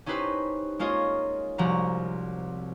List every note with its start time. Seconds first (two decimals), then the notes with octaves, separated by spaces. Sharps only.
0.06 C#4 D#4 E4 G4 B4 C5
0.79 G#3 A#3 C#4 F4 C#5 D#5
1.58 C2 F3 F#4 A#5